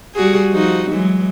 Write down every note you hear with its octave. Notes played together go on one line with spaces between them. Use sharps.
G3 F#4 G#4
F3 D#4 F#4
E3 F#3 G#3